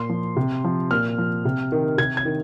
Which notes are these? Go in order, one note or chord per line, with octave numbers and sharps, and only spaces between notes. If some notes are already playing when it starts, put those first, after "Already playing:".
Already playing: A#2 C6
F3
C3
F3
A#2 F6
F3
C3
D#3
C3 G#6
G#6
D#3